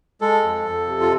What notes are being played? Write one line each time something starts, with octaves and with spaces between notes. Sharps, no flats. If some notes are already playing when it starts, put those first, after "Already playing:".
G#3 A4
F2
F2
C3
F4